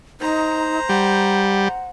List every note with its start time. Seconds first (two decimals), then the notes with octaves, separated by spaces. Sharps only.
0.21 D#4 C5 A#5
0.89 G3 F#5